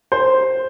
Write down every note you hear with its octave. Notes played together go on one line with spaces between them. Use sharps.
C5